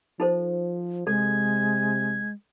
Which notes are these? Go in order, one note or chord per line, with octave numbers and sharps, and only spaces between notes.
F3 D#4 A4 C5
C3 G#3 A4 G#6